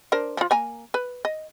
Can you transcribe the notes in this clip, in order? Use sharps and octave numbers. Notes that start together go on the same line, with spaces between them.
D4 A#4 C5
F3 F4
A#3 G#5 A#5
B4
D#5